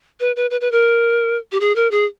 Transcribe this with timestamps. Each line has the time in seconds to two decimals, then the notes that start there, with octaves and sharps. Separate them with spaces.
0.20 B4
0.36 B4
0.51 B4
0.61 B4
0.72 A#4
1.52 G4
1.60 G#4
1.76 A#4
1.91 G#4